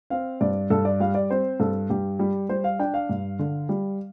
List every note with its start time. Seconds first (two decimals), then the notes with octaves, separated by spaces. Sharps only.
0.10 C4 F5
0.41 G2 D5
0.70 G2 A4
0.85 D5
1.00 G3 F5
1.15 D5
1.30 C4 C5
1.60 G2 A4
1.90 G2 G4
2.19 G3
2.49 G3 C5
2.64 F5
2.79 D4 G5
2.94 F5
3.09 G2
3.39 D3
3.69 G3